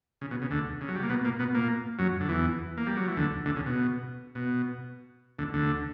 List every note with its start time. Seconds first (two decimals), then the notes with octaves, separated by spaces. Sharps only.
0.21 C#3
0.31 B2
0.42 C#3
0.50 D2 D3
0.81 C#3
0.88 F#3
0.96 G3
1.03 A#3
1.10 B2 B3
1.24 A#2 A#3
1.39 B2 B3
1.55 A#2 A#3
1.99 F#2 F#3
2.21 D3
2.28 E2 E3
2.77 A#3
2.87 G3
2.97 F#3
3.07 E3
3.16 D2 D3
3.46 D2 D3
3.56 C#3
3.66 B2
4.35 B2
5.39 D2 D3
5.54 D2 D3